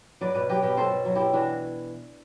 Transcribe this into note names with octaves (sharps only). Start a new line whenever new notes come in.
F#3 B4 D5
B2 B4 D5
F#3 G4 B4
B2 G4 B4
F#3 A4 C5
B2
F#3
B2 E4 G4
E3 D4 F#4